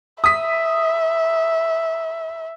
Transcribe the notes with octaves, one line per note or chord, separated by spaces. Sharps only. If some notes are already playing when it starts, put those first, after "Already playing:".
E5 D#6 B6